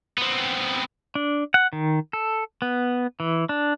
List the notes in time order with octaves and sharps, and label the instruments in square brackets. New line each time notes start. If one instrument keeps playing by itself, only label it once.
[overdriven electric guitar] B3 C4
[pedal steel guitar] D4
F#5
D#3
A4
B3
E3
D4